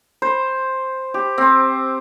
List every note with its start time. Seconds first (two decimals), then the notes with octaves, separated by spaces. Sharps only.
0.22 C5
1.14 G4
1.38 C4